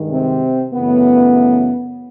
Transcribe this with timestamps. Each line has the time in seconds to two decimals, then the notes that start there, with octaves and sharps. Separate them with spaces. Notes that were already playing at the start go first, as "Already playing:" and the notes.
Already playing: G2 D#3 G#3
0.11 C3 C4
0.74 F#2 C#3 E3 A3 B3